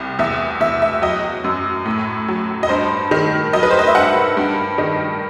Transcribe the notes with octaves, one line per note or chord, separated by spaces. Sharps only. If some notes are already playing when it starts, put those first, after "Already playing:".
Already playing: C2
E2 E5
E2 E5
E5
F#3 D#5
F#2
A2
F#3
D#5
G2 C5
D#3
F#3 D#5
B4
C5
D#5
E5
G2 F#5
G2
D#3